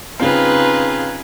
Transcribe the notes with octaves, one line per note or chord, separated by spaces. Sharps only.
C#3 C4 D#4 F4 G#4 B4